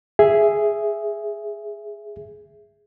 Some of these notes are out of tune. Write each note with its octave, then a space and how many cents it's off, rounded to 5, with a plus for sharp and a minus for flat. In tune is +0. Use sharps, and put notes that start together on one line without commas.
G#4 +0 E5 +5